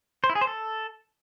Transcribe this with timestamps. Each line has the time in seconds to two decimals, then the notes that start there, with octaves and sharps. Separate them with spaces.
0.24 C5
0.30 E4
0.35 G#4
0.41 C5
0.47 A4